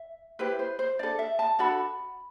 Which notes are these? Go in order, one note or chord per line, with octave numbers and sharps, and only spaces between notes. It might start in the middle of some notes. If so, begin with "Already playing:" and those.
Already playing: E5
E4 G4 B4 C5
C5
C5
D4 A4 D5
E5
A5
D4 F#4 A4 B5